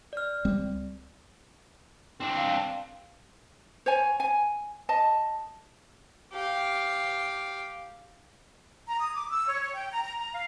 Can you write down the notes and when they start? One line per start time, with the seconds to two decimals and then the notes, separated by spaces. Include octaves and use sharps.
0.13 D5 F6
0.45 C#2 G3 C4
2.20 C4 D4
2.37 F5
3.86 C5 C#5 G#5
4.20 G#5
4.89 D#5 A5
6.33 G4 F5
8.88 A#5
8.99 D#6
9.14 D6
9.30 E6
9.47 C#5
9.61 C#5
9.74 G5
9.91 A#5
10.04 A#5
10.18 A#5
10.31 F5